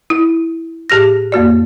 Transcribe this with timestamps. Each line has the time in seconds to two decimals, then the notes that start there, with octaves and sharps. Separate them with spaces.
0.10 E4
0.90 A2 G4 F6 A#6
1.32 F2 A#3 F#4 D5